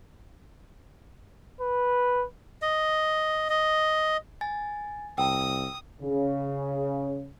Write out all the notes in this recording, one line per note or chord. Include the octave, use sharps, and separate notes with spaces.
B4
D#5
D#5
G#5 A6
C2 G5 A#5 D#6 E6
C#3